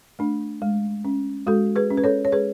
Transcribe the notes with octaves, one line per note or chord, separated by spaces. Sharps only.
A3 D4
G#3
C#4
G#3 F#4 A4
G#4 B4
C#4
B4
A4 C#5
C#5
G#3 G#4 B4